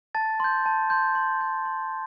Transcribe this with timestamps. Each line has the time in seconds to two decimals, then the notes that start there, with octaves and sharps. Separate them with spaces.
0.15 A5 A6
0.40 C6 G6
0.66 A5
0.90 C6 G6
1.15 C6
1.41 G6
1.65 C6